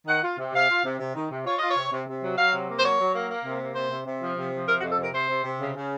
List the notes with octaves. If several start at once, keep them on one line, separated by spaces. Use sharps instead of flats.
D#3 F#5
F4
C3
C3 F5
F4
C3
C3
D#3
C3
F4 C#5
F4 D#5
C#5
C3
C3
C3
F#3
F#3 F5
C3
A#3
C5
F#3 C#5
F#3
A#3
A#3
C3
A#3
C3 C5
C3
C3
F3
C3
F3
C3 A#4
F#4
F2
A4
C3 A#4
C3 C5
C3
C3
C#3
C#3